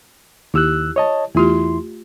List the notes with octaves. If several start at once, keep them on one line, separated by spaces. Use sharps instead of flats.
D#2 E4 G4 E6 F#6
C#5 D#5 A5
E2 A3 E4 F4 G4 C6